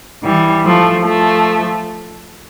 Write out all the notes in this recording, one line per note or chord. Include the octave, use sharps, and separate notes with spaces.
E3 G3
F3 A3
F3 A3